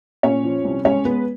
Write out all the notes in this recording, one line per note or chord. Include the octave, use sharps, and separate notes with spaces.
A#2 C#4 C#5
F3
C2
G#3 C#4 C#5
G#3 B3 B4